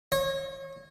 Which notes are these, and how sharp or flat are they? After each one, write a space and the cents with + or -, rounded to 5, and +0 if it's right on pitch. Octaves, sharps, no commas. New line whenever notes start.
C#5 -30